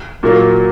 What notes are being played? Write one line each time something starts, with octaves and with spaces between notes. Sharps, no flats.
A#2 F#3 A#3